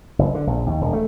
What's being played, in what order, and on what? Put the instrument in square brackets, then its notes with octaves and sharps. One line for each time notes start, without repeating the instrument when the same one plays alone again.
[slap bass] F#1
D3
A#1
D#2
E1
A3